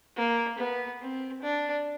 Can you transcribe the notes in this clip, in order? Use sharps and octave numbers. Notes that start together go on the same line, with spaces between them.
A#3
B3
C4
D4